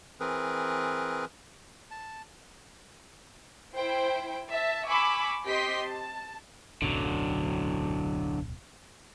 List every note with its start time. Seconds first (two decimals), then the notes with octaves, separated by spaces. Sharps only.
0.20 E3 C4 G#4 A#4 B4
1.91 A5
3.76 E4 C5 G5
4.50 E5 A5
4.88 G#5 B5 C#6 D6 E6
5.44 C4 G4 D#5 C6 B6
5.85 A5
6.82 D1 B1 F#2 D3 F#3